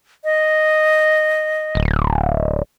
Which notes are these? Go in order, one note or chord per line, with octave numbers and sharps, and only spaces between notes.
D#5
D1